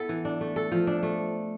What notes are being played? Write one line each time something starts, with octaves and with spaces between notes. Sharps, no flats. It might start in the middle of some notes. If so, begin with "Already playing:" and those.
Already playing: B3 E4 A4
E3
D4
A3
A4
F3
D4
A3